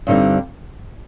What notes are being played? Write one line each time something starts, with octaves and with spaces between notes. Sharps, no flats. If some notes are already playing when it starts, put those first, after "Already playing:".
G2 D3 G3 C4 D#4